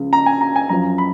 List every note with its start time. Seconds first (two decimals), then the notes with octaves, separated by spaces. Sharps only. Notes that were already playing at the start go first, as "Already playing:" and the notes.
Already playing: C#2 C#3 F3
0.13 A#5
0.26 G#5
0.41 A#5
0.56 G#5
0.69 F#2 F3 A#5
0.98 B5